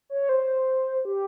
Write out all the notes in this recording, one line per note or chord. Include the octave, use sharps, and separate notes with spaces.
C#5
C5
G4